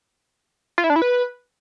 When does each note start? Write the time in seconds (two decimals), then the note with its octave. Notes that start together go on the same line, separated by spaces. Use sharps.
0.78 F4
0.84 E4
0.90 D4
0.96 E4
1.02 B4